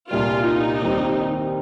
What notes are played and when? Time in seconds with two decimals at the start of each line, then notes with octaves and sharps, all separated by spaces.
0.10 C2 A#2 G3 D4 F4
0.47 D#4
0.82 D#2 D#3 G3 C4